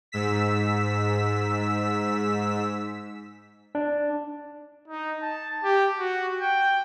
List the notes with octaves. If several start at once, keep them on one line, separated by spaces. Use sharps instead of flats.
G#2 E6 B6
D4
D#4
A5
G4
F#4
G5